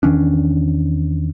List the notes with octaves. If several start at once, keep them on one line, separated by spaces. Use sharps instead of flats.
E2 D#3 C#4 D4